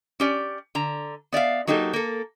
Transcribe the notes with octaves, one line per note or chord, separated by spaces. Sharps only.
C#4 G4 D5
D3 A#5
B3 D5 E5 F5
F#3 A#3 D#4 G4 A4
A#3 A4